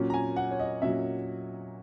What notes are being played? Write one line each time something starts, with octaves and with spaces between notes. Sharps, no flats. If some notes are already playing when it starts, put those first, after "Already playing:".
Already playing: A#2 F#3 C#4
A#5
G#5
F#5
C#5
D#5
A#2 F#3 C#4 E5